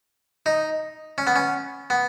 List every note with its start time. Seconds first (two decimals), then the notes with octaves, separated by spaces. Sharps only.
0.46 D#4
1.18 C#4
1.27 B3
1.36 C#4
1.90 B3